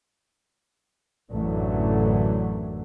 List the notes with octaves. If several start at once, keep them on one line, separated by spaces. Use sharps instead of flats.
A1 F#2 D3 E3 F#3 A3